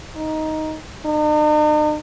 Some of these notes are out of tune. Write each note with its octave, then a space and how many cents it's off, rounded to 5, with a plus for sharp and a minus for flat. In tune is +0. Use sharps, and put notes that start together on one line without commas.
D#4 +5
D#4 -45